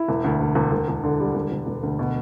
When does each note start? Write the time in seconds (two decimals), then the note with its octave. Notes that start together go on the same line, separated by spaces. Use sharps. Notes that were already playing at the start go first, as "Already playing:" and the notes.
Already playing: E4
0.08 E1
0.24 D2
0.40 D2
0.55 E1
0.72 E1
0.88 E1
1.04 D3
1.20 G3
1.35 E1
1.51 E1
1.66 E1
1.83 D2
1.99 B2